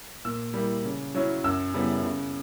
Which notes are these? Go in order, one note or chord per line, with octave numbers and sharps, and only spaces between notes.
A#2 E6
G3 A#3 E4
C#3
F#3 C#4 E4
F#2 E6
C#3 G3 B3 E4
C#3